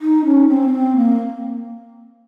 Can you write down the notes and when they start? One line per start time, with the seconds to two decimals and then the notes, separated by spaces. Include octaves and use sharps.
0.01 D#4
0.25 C#4
0.48 C4
0.68 C#4
0.72 C4
0.96 A#3